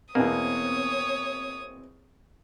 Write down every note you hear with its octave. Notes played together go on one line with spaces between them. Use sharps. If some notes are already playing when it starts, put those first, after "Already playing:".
E2 B2 A#3 C4 C#5 D#6